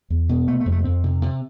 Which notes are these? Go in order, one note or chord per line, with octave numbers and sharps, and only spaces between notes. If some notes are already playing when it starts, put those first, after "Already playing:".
E2
B2
C3 A3
A3
F2
A3
F2 C4
C3
C3